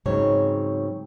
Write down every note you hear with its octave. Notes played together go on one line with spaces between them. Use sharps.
G#2 C#3 F#3 C4 C#5